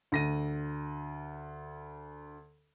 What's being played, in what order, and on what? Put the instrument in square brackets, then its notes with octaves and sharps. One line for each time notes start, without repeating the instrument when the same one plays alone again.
[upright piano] D2 A#6 D#7